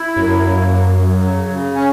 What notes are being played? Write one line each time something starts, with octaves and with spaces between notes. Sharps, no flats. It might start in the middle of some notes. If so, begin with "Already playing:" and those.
Already playing: E4
F#2 F#3
A#3
F#3
F#3
C#3
C#3
C#4